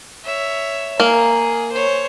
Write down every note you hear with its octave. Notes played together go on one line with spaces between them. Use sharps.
C#5 E5
A#3 G#4
C5 C#5